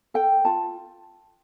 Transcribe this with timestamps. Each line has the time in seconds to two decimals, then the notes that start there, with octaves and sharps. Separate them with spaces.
0.14 A4 G5
0.45 F4 A5